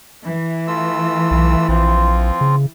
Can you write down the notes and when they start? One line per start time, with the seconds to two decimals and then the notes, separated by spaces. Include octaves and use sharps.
0.24 E3
0.68 A3 F4 E6
1.31 B1
1.69 A#1 F3 C4 F4
2.41 C#3